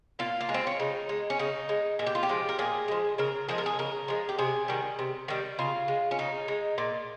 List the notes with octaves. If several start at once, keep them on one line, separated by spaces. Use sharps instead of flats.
A#2 F4
A#3
G#3
C4
C#4
C#3 D#4
G#3
C#4
C#3 D#4
G#3
A#2 G#4
G4
F4
G4
F3 G#3
A#4
A#2 G#4
F3 G#3
C#3 A#4
F3 G#3 G#4
A#4
G#4
C#3 A#4
F3 G#3
G4
C3 G#4
D#3 G3
C3
D#3 G3
C#3 F4
G#3
C#4
C#3 D#4
G#3
A#2